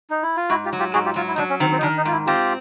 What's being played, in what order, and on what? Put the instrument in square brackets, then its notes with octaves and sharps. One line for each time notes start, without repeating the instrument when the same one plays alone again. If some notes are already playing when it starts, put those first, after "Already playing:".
[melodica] D#4
E4
F4
[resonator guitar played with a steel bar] G#2 [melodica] E4 F#4
[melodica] F4 G4
[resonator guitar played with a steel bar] F#3
[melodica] F4 G4
[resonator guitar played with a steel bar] G#2 [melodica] F#4 G#4
[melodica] F4 G4
[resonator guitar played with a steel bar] F#3 [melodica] F4
[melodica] E4
D#4
[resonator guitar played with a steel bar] F#3 [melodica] D4
[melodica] C#4
[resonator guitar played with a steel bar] D#3 [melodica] C4
[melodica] C4
D#4
[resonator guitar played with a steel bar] D#3 [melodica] D4
[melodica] D#4
[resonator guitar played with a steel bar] G#2 [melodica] F4
[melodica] E4
[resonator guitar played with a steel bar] C4 [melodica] F4 G4